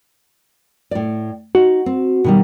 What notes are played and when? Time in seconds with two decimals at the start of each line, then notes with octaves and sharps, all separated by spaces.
0.91 A2 D5
1.55 D#4 F#4
1.86 C4
2.24 B2 D#3 G3